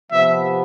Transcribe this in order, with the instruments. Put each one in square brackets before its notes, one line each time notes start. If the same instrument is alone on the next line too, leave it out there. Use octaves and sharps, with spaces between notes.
[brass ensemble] C3 F3 B3 [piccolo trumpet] E5